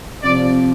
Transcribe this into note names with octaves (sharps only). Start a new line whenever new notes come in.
C3 F3 D5